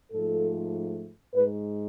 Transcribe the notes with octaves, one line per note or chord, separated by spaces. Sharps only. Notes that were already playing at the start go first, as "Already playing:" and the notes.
G#2 F3 A3 A4
G#2 G#3 B4